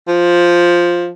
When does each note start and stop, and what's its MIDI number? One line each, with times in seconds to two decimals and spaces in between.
0.08 1.09 53